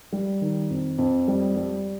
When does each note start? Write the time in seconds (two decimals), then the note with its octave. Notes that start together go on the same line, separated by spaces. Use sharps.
0.13 G3
0.41 D#3
0.70 F2
0.98 F2
1.28 G3
1.56 G3